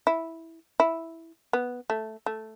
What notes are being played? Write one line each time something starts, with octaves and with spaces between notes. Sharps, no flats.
E4
E4
B3
A3
A3